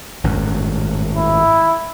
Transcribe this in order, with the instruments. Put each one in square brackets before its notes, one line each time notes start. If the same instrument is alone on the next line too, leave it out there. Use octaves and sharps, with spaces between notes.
[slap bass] G#1 F#2 A2
[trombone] E4